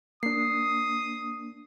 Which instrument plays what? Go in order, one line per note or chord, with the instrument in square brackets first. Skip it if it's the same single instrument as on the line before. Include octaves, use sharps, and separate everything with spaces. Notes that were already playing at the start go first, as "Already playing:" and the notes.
[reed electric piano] A#3 D4 [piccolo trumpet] D#6 [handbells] C7